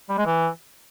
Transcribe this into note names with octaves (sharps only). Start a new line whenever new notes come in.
G3
G#3
E3